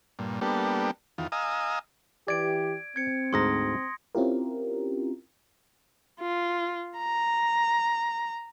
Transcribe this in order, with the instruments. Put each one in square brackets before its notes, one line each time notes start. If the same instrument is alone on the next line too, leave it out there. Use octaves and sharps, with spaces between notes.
[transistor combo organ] G2 A#2
G3 A#3 B3 D4 G4 A4
E2 D#3 F4
D#5 F5 G#5 A#5 D#6 E6
[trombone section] E3 G4 [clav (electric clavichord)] D5 [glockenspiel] G#6 D7
[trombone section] C4 [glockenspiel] G#6 C#7
[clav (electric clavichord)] D2 G#2 A#5 [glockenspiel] C6 D#6 A#6
[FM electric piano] C4 C#4 E4 F4 G4 A#4
[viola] F4
A#5